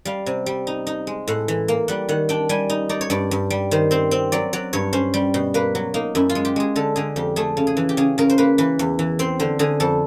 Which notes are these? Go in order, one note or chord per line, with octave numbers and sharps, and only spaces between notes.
G3 F5
C3
G3
D#4
D#4
G#3
A2 F#5
E3
A#3
G3 F#5
D#3 F#5
D4 G5
G3 G#5
D#4
D#4 D5
C#5
G2 D5
G2
G3
D#3 C5
C4 C5
C4
F#3 D5
F#3 D5
G2 C#5
C#4 C5
G3
B2
A#3 B4
F#3
A#3 D#4
F#2 E4
F4
G#3
G4
G#3 G#4
D3 A4
D3 G#4
F2 G4
A3 G#4
C#3
G#4
E3
G4
C#3 G#4
C#3 A#4
C5
A#3 B4
E3 B4
E2
E3
C4 C5
D3 C5
D3 G#4
F2 A4